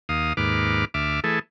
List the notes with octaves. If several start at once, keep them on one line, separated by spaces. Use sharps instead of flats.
D#2 F5 D#6
D#2 G#2 B4 D6 F6
D2 E5 D6 F6
E3 A3 G#4 A4